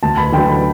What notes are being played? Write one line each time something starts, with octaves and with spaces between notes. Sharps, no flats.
D2 A5
B5
D3 F#3 G5
B5